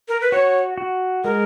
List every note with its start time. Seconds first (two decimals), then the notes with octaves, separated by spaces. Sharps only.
0.08 A#4
0.21 B4
0.32 F#4 C#5
0.78 F#4
1.24 G#3 A#4